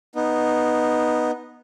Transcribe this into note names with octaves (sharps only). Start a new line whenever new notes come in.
B3 D#4